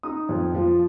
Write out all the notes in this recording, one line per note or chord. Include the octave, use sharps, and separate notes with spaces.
D#4 D#6
F2
F3